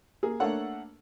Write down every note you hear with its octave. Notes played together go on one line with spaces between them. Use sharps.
A#3 G#4
A3 A#3 D4 A4 C#5 F#5